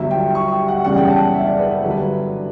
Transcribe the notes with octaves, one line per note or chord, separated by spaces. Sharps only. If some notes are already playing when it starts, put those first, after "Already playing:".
Already playing: G1 G2 F#3 E5
G5
C#6
G5
F#5
F#1 E2 C#3 G3 C#4 F#5
G5
A5
E5
D5
B4
B4
G2 D3 F#3 A4
B4